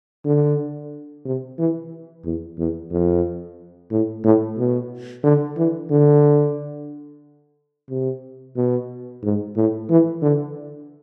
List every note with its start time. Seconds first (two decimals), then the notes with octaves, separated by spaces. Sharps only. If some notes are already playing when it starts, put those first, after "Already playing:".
0.25 D3
1.25 C3
1.58 E3
2.25 E2
2.58 E2
2.92 F2
3.91 A2
4.24 A2
4.58 B2
5.24 D3
5.57 E3
5.91 D3
7.90 C3
8.56 B2
9.23 G#2
9.56 A2
9.90 E3
10.22 D3